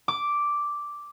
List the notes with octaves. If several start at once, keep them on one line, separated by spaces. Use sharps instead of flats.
D6